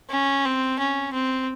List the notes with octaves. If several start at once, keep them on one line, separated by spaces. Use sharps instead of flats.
C#4
C4
C#4
C4